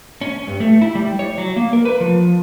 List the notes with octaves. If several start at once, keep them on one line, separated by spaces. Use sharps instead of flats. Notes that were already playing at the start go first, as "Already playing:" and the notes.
C#4
G2
A3
E4
G3
C#5
F#3
A#3
A#4
B4
F3